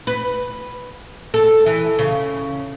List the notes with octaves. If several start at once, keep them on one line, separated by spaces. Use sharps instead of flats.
B4
A4
E3
C#3